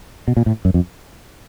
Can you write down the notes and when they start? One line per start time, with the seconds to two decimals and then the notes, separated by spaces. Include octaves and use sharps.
0.28 B2
0.37 A#2
0.46 A2
0.65 F#2
0.74 F2